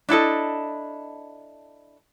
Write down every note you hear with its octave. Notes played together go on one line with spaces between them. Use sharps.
D4 E4 A4 D#5